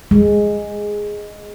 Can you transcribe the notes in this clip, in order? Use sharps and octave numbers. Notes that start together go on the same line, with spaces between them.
G#3